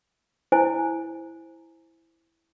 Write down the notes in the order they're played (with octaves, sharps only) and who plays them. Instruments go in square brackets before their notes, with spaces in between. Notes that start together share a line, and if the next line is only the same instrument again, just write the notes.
[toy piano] E4 C5 G#5